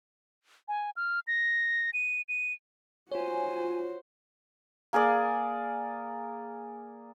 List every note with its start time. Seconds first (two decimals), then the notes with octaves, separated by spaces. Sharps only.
0.68 G#5
0.97 F6
1.27 A#6
1.94 D#7
2.29 D#7
3.12 F4 F#4 C5 C#5 G#5
4.93 A#3 G#4 A#4 D5